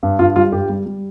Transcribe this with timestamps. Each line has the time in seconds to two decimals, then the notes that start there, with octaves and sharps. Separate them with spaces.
0.03 G2
0.19 G2 F4
0.36 G3 F4
0.52 G2 G4
0.69 G3
0.86 G3